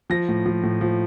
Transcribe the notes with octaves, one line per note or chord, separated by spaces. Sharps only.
F3 A#6
A2
F3
A2
F3